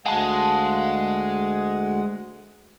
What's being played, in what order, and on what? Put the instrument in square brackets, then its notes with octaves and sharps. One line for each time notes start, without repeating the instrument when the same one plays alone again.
[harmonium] D2 F#5 [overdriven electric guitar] G#3 [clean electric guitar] F5 A5